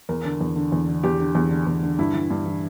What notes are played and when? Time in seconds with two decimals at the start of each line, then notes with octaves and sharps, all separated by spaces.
0.09 E2 A#4
0.25 D3
0.41 E2
0.56 D3
0.72 E2
0.88 D3
1.03 E2 G4
1.20 D3
1.35 E2
1.51 D3
1.67 E2
1.83 D3
1.99 G2 E4
2.15 E3
2.30 G2
2.46 E3